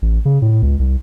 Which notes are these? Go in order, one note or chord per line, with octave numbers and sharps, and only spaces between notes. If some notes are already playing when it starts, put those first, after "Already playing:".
A1
C#3
A2
C#2
C2